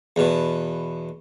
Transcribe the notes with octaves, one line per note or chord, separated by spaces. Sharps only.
E2 B2